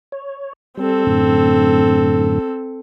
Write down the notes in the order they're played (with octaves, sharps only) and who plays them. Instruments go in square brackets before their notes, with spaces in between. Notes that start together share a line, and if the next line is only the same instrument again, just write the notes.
[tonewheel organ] C#5
[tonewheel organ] G3 [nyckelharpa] C4 A4
[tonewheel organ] F#2 A2 D3